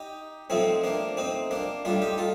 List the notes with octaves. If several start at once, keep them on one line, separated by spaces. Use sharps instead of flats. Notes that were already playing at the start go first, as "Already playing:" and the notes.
Already playing: D#4 G4
A2 F3 A3 C4 D#4
A#3 D4
C4 D#4
A#3 D4
A2 G3 D4 F4
D#4 G4
F4 A4